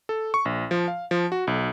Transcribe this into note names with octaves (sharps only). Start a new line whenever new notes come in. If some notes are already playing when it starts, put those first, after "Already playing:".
A4
C#6
A#1
F3
F5
F3
F#4
B1